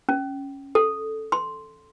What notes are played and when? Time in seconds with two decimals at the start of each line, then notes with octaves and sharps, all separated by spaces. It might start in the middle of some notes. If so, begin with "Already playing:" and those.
0.09 C#4
0.75 A4
1.32 C6